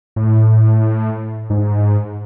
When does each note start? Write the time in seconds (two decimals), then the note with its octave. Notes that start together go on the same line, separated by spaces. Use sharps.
0.16 A2
1.50 G#2